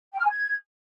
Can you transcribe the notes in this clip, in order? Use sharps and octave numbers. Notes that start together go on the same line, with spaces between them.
G5
F6
G#5
G#6